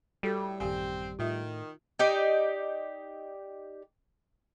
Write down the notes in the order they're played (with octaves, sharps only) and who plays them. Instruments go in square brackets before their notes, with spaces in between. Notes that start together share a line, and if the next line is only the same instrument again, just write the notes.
[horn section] A2 [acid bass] G3 [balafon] F#4 G4 A4
[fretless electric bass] A1 F#2 D#3 [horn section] C4 [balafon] G4 F5 G#5
[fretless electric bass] A2 [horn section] D#3 [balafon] F4 E5
[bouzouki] D#4 G4 D5